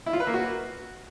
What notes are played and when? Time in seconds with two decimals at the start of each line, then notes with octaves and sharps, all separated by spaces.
0.06 E4
0.13 F4
0.20 B4
0.27 A#3
0.34 F#4